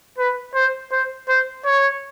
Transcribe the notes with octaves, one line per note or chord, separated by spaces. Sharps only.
B4
C5
C5
C5
C#5